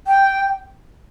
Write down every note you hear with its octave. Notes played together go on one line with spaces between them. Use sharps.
G5